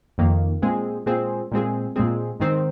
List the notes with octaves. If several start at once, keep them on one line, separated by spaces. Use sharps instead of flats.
F2 D#3 A#3
A#2 G#3 C4 G#4
A#2 G#3 C4 G#4
A#2 G#3 C4 G#4
A#2 G#3 C4 G#4
G#2 D#3 C4